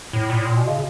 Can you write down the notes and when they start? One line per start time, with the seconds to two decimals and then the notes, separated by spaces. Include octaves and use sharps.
0.13 A2
0.30 A#2
0.35 A2
0.45 A#2
0.56 B2
0.67 C#3